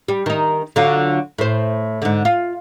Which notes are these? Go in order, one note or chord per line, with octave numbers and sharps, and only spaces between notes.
G3
D#3 D#4
D3 F#3 F4
A2 C5
G#2 D3
F4